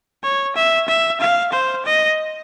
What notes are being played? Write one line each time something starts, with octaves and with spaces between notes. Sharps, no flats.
C#5
E5
E5
F5
C5
D#5